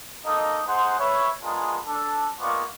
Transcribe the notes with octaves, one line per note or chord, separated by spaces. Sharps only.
A#3 D#4 A4 D#5
D#4 G#4 C5 F#5 C6
B4 C#5 E5
G#3 B3 D4 F4 G#4 A#4
D4 A4
G#3 A#3 B3 F4 D5 C#6